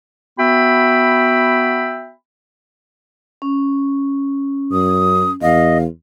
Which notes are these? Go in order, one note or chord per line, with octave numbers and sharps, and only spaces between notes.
B3 F#4 E5 G5 B5
C#4
F#2 D#6
E2 D#5 F5